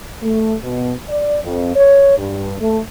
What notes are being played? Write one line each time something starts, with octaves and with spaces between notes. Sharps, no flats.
A3
B2
D5
F2
C#5
G2
A3